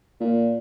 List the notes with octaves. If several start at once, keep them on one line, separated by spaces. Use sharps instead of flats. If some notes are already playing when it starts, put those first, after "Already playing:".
A#2